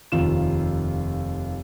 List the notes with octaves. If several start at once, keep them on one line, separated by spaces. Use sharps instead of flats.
F1 D#2 F4 E7